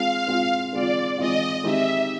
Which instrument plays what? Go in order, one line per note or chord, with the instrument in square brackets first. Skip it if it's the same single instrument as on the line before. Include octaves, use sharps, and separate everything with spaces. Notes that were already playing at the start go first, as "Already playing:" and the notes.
Already playing: [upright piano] G#3 C4 F4 [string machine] F5
[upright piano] G#3 C4 F4
[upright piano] G#3 C4 F4 [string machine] D5
[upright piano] G#3 C4 F4 [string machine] D#5
[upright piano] D#3 G#3 C4 D#4 G4 [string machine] E5